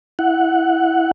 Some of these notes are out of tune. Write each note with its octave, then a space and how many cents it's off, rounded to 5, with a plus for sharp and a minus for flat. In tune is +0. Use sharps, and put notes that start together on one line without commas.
E4 +0 F#5 +0